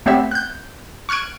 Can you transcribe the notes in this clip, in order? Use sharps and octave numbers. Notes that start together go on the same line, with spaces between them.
A3 B3 C4 G4 C#5 E5
F#6 G6
C#6 F6 F#6 G#6 D7